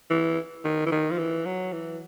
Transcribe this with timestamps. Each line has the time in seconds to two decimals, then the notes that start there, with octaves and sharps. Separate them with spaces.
0.10 E3
0.64 D#3
0.86 E3
0.92 D#3
1.10 F3
1.18 E3
1.46 F#3
1.73 E3